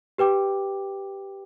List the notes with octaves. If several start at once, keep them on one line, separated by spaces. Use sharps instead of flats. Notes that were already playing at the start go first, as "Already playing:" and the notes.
G4 B4 G5 D6